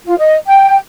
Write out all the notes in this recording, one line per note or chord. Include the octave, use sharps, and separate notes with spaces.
F4
D#5
G5